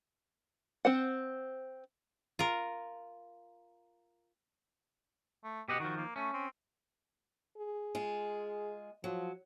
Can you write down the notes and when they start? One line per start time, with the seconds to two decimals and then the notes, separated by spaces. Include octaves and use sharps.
0.85 C4 C5 F#5
2.39 F4 A#4
5.44 A3
5.68 B2 G4 D#5 F#5
5.80 D#3 F3 F#4
5.97 A#3
6.16 A3 C#4
6.33 C4
7.57 G#4
7.95 G#3 F4
9.04 F3 F#3